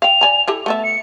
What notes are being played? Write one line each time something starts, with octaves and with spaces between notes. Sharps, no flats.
F5 G5 F7
D5 G#5 A#5
E4 G4 A4
A3 B3 E5 A5
C#7